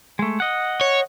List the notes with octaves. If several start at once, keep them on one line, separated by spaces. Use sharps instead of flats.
G#3 A3
D#5 F#5
C#5